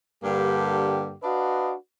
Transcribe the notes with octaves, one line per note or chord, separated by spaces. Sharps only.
G2 D3 G3 A#3 G4
D4 F#4 B4 D5 D#5 F5